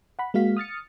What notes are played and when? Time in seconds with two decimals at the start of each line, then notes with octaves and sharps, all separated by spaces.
0.19 F#5 B5
0.34 G#3 A#3 F#4 F5 B6
0.57 D#6 F6 A6 C#7